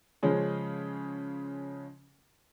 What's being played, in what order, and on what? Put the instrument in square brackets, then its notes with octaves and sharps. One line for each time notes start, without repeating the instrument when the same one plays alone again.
[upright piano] C#3 F3 G#3 C#4 G#4